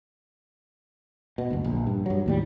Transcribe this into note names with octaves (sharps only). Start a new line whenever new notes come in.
B2
F#1 D2
A#1
G2
G2 F#3
D#2 A2 G3